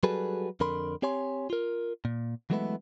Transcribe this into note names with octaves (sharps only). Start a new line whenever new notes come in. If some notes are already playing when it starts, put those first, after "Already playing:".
F#3 G3 F#4 G#4 A4 B4
F2 D3 A#4 B5 C6
C4 G4 C#5 G#5 C6
F4 A#4
A#2
E3 F#3 G#3 A3 B3 E4